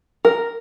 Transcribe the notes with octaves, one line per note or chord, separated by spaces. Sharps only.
A#4